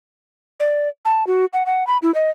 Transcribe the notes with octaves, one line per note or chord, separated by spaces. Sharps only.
D5
A5
F#4
F#5
F#5
B5
E4
D#5